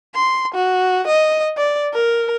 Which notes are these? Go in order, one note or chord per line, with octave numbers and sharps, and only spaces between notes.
C6
F#4
D#5
D5
A#4